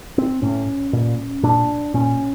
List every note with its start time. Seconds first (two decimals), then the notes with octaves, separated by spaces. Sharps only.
0.18 C4
0.42 A2 C#4
0.93 A#2
1.43 A#2 D4
1.94 A#2 C#4